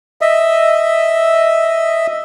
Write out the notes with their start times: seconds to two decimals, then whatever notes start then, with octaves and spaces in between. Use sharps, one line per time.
0.21 D#5 E5